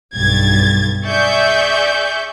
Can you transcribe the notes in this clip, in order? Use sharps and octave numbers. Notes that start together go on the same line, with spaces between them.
B1 G2 G#6 A6
G#4 D5 E5 C#6 G6